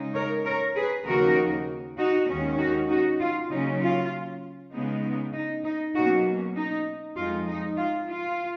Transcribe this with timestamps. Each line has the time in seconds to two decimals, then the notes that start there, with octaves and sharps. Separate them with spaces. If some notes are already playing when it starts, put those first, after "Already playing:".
Already playing: C#3 G#3 D#4
0.14 A#4 C#5
0.45 A#4 C#5
0.76 G#4 B4
1.05 D#2 C#3 F3 A#3 D#4 F#4 A#4
1.98 D#4 F#4
2.28 D#2 D#3 G#3 C#4
2.58 D#4 F#4
2.89 D#4 F#4
3.20 F4
3.50 C#3 F#3 A#3 C#4 D#4
3.80 F4
4.72 C#3 G#3 B3 D#4
5.33 D#4
5.64 D#4
5.95 B2 F#3 A#3 C#4 D#4 F#4
6.55 D#4
7.16 F2 F3 G#3 D#4 F4
7.47 D#4
7.77 F4
8.09 F4